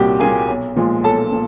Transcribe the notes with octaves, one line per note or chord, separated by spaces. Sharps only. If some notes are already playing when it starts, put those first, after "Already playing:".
Already playing: C2 A#2 G3 A#3 F#4 G4 G5
A#2 G3 A#3 G#4 G#5
B1
A#2 F3 G#3
B1 A4 A5
A#2